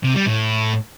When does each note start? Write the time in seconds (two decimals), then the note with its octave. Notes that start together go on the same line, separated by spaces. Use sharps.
0.04 C3
0.15 G3
0.27 A2